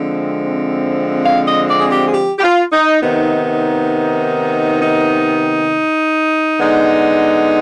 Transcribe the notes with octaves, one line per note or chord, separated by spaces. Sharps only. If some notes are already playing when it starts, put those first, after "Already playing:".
Already playing: D3 F3 G#3 C4
F5
D#5
D5
G#4
G4
G#4
G4
G4
F4
D#4
C3 D#3 B3 D#4
D#4
D3 G#3 B3 D#4